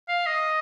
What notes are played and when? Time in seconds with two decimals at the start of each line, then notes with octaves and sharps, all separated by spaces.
0.08 F5
0.26 D#5